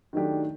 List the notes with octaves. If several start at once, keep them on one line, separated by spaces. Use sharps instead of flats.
D#3 F#3 A3 D4 G4